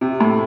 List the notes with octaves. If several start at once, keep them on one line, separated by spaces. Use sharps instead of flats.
C3
A2